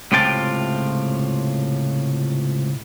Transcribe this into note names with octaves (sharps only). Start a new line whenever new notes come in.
C#2 A2 C3 F4 G5 A5